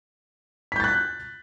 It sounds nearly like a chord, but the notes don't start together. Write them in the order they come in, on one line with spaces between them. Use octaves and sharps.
B6 G6 A6 F#6